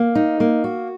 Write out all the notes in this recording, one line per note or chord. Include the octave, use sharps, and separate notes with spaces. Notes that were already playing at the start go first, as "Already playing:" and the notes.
Already playing: A#3
D#4
A#3
F#4